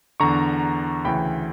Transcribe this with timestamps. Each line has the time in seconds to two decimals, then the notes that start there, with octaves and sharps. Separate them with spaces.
0.20 E2 D3 A#5 C#6
1.05 D2 C#3 E3 G5 B5